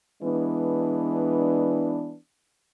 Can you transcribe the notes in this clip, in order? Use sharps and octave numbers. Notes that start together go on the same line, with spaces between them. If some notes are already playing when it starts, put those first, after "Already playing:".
E3 G#3 B3 D4